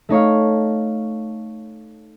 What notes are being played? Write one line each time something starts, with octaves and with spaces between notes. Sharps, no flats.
A3 D#4 C#5 F5